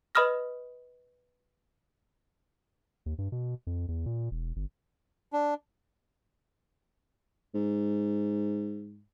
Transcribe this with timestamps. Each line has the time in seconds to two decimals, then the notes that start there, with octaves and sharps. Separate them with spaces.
0.15 B4 D#5 B5 D#6 F6 A#6
3.06 D#2
3.18 G2
3.32 B2
3.67 F2
3.88 E2
4.06 A#2
4.31 E1
4.56 G1
5.33 D4
7.55 G#2